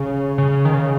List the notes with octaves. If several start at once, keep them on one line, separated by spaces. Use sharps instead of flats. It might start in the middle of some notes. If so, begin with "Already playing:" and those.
Already playing: C#3
C#3
D#3
C#3